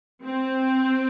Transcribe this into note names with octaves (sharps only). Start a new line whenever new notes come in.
C4